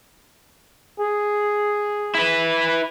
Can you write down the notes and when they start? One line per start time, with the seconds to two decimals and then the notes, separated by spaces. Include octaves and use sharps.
1.00 G#4
2.15 E4 B4